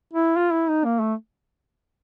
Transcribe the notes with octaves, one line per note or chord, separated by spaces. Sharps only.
E4
F4
E4
D#4
A#3
A3